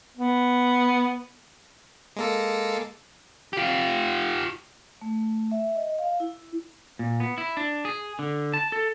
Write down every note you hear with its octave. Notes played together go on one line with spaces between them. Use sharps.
B3
G#3 A#3 A4
F4 G4
A3
E5
D#5
F5
E4
A#2
B3
E4
D4
G#4
D3
A5
A4